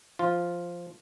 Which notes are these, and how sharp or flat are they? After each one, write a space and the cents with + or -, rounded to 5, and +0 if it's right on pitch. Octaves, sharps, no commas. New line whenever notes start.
F3 +0 F4 +0